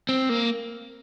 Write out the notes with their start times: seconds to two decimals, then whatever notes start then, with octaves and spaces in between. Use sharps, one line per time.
0.09 C4
0.29 A#3